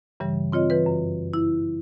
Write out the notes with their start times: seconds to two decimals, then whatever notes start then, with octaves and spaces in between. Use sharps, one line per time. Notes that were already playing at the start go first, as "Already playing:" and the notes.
0.20 G2 C#3 E3 G3
0.52 C4 F4 C#5 D#5
0.70 E3 B4
0.86 F#2
1.34 E4